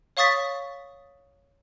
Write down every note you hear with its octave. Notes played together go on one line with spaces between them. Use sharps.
C#5 F5 C#6 D#6 A6 B6